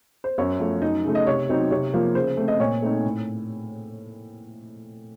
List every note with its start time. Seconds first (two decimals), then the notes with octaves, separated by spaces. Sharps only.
0.24 C5
0.38 F#2 C#5
0.60 F3 A3
0.82 F#2 D#4 D#5
1.05 C#3 A3
1.15 D#5
1.27 C3 C#5
1.49 F#3 C4 D#4
1.71 C3 C#5
1.93 F3 A#3 F4
2.15 C#3 C5
2.37 A3 C4
2.48 D#5
2.60 A#2 C#5
2.82 A3 C4 D#4
3.05 A2